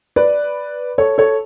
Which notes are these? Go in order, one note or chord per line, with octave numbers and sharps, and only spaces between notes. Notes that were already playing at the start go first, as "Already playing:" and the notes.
B4 D5
A4 C#5
A4 C#5